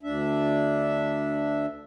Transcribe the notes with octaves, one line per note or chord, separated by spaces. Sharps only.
D2 D4 E5